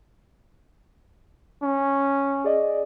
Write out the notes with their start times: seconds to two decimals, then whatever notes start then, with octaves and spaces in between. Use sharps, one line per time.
1.63 C#4
2.44 G#4 D5 D#5